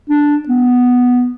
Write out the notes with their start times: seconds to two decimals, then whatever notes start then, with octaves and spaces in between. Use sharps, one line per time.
0.10 D4
0.48 B3